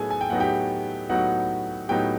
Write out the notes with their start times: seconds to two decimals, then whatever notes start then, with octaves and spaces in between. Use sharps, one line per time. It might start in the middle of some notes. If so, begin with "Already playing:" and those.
Already playing: A2 F#3 B3 D#4 G#4 A4 G#5
0.10 G#5
0.21 G5
0.30 A2 F#3 B3 D#4 F#5
0.40 G4 G5
1.09 A2 F#3 B3 D#4 F#4 F#5
1.89 A2 F#3 B3 D#4 G4 G5